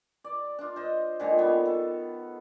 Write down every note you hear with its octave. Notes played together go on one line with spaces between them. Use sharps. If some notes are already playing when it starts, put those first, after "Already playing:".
D5
D4 F4
C5 D#5
A#2 D3 D#3 G#3
G3 B3 C#5
A4